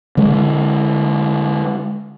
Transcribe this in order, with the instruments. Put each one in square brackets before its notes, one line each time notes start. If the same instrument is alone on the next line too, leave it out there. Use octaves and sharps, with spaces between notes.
[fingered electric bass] D3 G#3